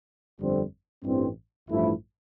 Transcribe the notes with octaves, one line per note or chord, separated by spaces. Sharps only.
G1 F2 D3 G3 C4
A1 G2 E3 G3 C4
A1 G2 F3 A3 E4